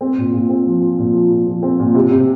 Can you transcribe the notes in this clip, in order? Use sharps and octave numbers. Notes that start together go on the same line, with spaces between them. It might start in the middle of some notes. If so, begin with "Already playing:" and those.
C4
A#2
A#2
C4
F3
F3
A#2
F3
A#2
F3
C4
A#2
C3
C3